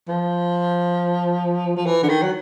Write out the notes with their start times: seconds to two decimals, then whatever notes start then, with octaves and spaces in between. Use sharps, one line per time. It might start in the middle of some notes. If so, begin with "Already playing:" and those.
0.08 F3
1.76 F3
1.86 E3
2.03 D3
2.09 D#3
2.23 F#3